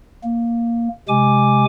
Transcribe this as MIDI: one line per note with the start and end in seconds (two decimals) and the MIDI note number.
0.24 0.88 58
1.08 1.65 48
1.08 1.65 56
1.08 1.65 80
1.08 1.65 86